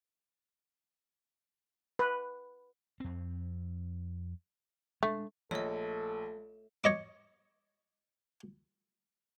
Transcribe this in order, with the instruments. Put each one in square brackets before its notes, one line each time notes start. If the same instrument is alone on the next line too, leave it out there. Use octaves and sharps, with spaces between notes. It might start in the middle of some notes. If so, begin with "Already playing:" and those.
[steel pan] B4
[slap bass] F2 C4
[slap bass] G#3 D4 [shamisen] A3
[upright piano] A#1 [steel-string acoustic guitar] A3 [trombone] A4 [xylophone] C#5 D#5
[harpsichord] C#5 D#5 D6